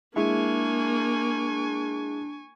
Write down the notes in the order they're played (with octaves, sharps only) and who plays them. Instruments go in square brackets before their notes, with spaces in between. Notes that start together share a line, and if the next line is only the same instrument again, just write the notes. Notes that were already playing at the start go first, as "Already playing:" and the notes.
[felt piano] G#3 E4 [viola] A#3 [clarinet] D4 [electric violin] G#5 C#6